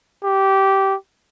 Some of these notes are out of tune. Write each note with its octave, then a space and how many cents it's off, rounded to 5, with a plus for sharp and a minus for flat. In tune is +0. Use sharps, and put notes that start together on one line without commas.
G4 -15